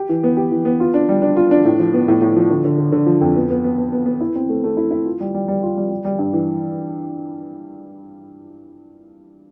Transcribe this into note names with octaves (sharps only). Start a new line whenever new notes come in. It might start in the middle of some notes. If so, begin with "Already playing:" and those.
Already playing: G4
E3
B3
G4
E3
B3
F4
D4
G3
D4
F4
D4
A2
F3
B3
A2
A2
F3
D3
D3
D3
D3
F3
F2
B3
B3
B3
B3
B3
B3
E4
C4
A3
A3
E4
E4
F4
G3
G3
G3
F4
G3
G3
G3
G2
E3